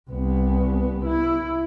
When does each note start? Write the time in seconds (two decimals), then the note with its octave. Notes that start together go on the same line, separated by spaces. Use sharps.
0.10 C2 B3
1.05 E4